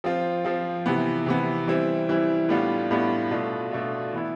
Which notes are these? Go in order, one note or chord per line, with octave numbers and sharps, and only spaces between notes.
F3 C4 F4
F3 C4 F4
C3 E3 B3
C3 E3 B3
E3 G3 C4 E4
E3 G3 C4 E4
A2 G3 B3 D4 F4
A2 G3 B3 D4 F4
B2 A3 D4 F4
B2 A3 D4 F4
E3 B3 E4